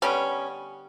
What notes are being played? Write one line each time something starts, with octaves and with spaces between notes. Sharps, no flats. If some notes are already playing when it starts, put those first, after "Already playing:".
D3 G3 B3 C#4